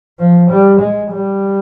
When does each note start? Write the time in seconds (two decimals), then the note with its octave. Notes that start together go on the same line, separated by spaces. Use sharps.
0.19 F3
0.50 G3
0.80 G#3
1.12 G3